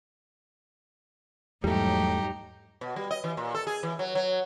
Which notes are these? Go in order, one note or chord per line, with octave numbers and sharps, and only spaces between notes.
E2 G#2 F#3 G3 A3 D#4 G4
B2
G3
D#5
E3
A#2
A4
G#4
E3
F#3
F#3